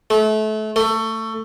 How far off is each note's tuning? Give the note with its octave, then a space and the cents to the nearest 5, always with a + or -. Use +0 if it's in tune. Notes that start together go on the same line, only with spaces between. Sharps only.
A3 -30
A3 +20